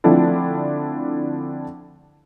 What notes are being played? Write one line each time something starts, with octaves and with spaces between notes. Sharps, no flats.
D3 F3 A3 C4 D4 E4